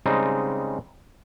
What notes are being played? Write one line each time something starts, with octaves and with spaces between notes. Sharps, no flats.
C#3 G3 G#3 C4 D#4